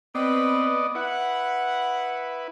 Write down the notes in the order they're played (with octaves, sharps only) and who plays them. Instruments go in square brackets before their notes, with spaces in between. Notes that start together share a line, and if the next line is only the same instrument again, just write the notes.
[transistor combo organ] B3 D5 D#5 [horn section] C4 B4
[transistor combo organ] E4 B4 [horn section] F#5